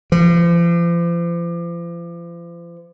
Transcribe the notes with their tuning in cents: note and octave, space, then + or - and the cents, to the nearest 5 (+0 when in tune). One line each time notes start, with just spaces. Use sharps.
F3 -40